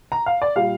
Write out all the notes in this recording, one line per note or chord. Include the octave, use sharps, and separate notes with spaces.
A#5
F5
D5
A#2 G3 F5